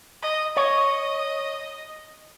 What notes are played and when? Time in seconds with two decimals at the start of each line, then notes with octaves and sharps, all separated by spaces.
0.22 D#5
0.57 C#5 D#5